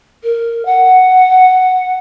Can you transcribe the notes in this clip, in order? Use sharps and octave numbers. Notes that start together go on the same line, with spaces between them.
A#4
F#5